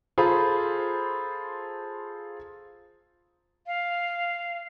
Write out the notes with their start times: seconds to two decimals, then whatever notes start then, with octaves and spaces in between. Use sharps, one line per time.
0.18 F4 G#4 A4 C5 A#5 B5
3.67 F5